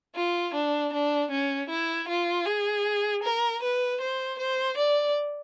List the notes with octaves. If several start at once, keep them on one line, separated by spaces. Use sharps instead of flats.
F4
D4
D4
C#4
E4
F4
G#4
A#4
B4
C5
C5
D5